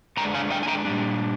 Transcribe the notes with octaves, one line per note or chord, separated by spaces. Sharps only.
D3 G#3 D4 G5 A#5
F5 G#5
D#5 G5
G#5
G5 A#5
A#2 G3 D4